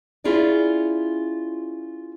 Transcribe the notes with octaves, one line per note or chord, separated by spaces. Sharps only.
C#4 E4 F4 G#4 C#5 D5